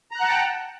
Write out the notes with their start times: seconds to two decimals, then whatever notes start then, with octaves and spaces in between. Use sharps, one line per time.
0.11 A#5
0.16 F#6
0.20 F#5
0.25 A5
0.29 G5